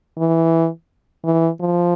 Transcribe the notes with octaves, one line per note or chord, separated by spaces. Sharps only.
E3
E3
F3